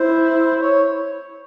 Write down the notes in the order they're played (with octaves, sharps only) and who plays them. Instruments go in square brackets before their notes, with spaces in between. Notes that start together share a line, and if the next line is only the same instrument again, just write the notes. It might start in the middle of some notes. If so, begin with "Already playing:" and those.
Already playing: [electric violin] E4 [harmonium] C5
[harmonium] C#5